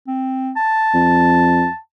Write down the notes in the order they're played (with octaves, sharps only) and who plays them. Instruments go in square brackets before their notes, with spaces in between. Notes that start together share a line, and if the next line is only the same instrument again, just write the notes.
[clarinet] C4
A5
[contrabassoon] F2